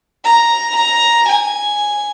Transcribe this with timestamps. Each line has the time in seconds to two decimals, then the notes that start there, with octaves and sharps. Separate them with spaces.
0.25 A#5
0.77 A#5
1.29 G#5